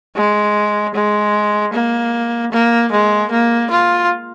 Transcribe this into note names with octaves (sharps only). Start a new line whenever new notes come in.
G#3
G#3
A#3
A#3
G#3
A#3
F4